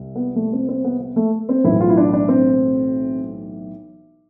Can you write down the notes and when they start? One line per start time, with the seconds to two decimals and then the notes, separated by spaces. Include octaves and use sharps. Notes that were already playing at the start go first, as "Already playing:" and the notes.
Already playing: C2
0.15 B3
0.36 A3
0.53 C4
0.68 C4
0.84 B3
1.00 B3
1.16 A3
1.49 C4
1.64 B1 A2 E3 E4
1.80 F4
1.90 E4
1.97 D4
2.13 D4
2.28 C4